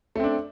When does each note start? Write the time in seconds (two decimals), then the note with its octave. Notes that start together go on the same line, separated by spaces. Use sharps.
0.16 A3
0.20 C4
0.24 D4